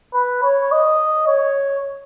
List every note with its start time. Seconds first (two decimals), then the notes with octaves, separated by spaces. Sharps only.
0.14 B4
0.43 C#5
0.71 D#5
1.27 C#5